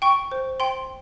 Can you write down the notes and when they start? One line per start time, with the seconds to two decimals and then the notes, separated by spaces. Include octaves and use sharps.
0.02 G5 C#6
0.32 C5
0.60 G5 C6